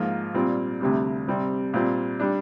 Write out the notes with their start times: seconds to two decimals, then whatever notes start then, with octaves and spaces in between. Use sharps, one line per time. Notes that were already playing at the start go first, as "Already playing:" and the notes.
Already playing: G#2 F3 A#3 F4
0.34 A#2 G3 C4
0.81 D2 C3 G3
1.27 C3 G3 C4
1.73 A#2 G3 C4
2.20 G3 D4